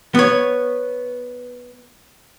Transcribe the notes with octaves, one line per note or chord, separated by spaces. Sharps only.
B3 C#5